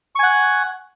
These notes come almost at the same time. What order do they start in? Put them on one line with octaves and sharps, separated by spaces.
C#6 G#5 F#5